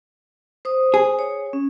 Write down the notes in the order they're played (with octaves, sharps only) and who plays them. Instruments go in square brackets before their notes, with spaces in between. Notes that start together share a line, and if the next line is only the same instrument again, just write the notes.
[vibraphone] C5 D#6
[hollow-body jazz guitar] G#4
[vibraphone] C#5
C#4